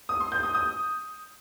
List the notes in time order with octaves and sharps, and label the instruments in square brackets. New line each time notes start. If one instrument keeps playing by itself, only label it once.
[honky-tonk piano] D#6
C6
G6
D#6
D#6